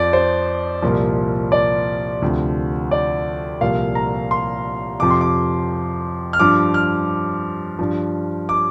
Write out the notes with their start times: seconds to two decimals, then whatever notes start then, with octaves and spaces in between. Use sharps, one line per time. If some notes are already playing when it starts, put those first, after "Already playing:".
Already playing: F2 F3 D5
0.13 C5
0.82 C2 A#2 F3
1.52 D5
2.22 D2 C3 F3
2.91 D5
3.61 C2 A#2 F3 F5
3.95 A#5
4.31 C6
5.00 F2 C3 F3 D6
5.11 C6
5.21 D6
6.33 F6
6.40 G2 F3 D6
6.74 F6
7.79 G2 F3
8.49 D6